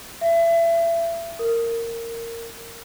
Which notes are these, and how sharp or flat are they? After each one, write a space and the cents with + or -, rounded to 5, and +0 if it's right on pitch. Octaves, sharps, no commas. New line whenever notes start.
E5 +30
A#4 -15